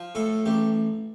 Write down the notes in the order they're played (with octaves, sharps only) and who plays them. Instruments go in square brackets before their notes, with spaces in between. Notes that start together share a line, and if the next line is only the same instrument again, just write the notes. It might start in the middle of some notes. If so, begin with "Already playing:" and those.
Already playing: [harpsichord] F3
A2 A4
A1 G4